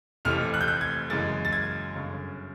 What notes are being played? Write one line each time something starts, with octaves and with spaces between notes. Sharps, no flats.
F1 F2 C3 E3 A3 F6
F#6
G6
F#6
G#6
F#1 F#2 C#3 E3 G#3 A6
A6
G#6
G1 F#2 C#3